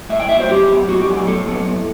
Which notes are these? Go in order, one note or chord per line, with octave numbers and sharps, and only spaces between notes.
A2 E5
G5
F#3 B3 E5
C5
A2 G4
F#3 B3
A2 F#4
G4
F#3 B3
G4
A2 A4
F#3 B3
A2